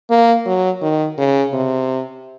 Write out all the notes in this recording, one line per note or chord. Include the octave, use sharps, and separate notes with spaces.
A#3
F#3
D#3
C#3
C3